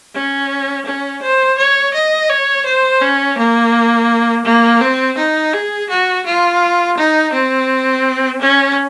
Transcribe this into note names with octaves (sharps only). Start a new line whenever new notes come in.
C#4
C#4
C5
C#5
D#5
C#5
C5
C#4
A#3
A#3
C4
D#4
G#4
F#4
F4
D#4
C4
C#4